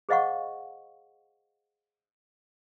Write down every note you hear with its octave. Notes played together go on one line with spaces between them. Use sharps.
G#4 C5 D#5 F5 F#5 C#6